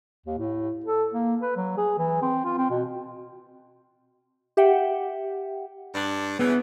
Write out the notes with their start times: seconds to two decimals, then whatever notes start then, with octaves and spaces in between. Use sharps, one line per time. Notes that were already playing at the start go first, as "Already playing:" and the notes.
0.26 D#2
0.38 A2
0.86 A4
1.13 A#3
1.42 B4
1.57 F#3
1.78 G#4
1.98 E3
2.22 C4
2.45 F4
2.58 C4
2.70 B2
4.57 G4 E5 F#5 G5
5.95 G2 D4
6.39 C#3 E3 B3